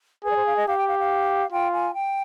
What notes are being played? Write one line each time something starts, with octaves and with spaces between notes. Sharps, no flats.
G#4 B4
D5
C5
F5
D#5
G4 F5
G5
F5
F5
F4 G5
G#5
G5